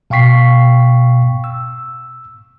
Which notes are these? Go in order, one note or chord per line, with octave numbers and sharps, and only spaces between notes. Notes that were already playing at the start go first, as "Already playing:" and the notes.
B2 F5 G5 C#6 B6 C7
E6